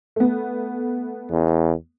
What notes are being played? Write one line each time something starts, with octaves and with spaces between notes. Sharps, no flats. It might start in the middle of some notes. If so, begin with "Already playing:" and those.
A3 B3
E2